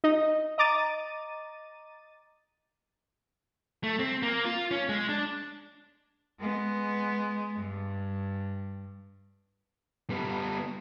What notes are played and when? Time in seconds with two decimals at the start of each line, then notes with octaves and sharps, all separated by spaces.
0.04 D#4 D#5
0.58 D#5 A#5 D6 A6 D#7
3.83 A3
4.00 C4
4.23 A#3
4.45 F4
4.71 C#4
4.89 G#3
5.09 D4
6.39 G#3 B3
7.58 G2
10.10 G3 B3